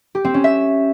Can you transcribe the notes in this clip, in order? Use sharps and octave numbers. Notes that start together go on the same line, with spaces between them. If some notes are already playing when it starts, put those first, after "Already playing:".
G4
C4
C#4
E5